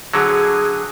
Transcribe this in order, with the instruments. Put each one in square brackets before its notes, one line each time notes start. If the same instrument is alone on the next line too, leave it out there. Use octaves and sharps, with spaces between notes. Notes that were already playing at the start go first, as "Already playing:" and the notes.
[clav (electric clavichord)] D3 F#3 [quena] G#4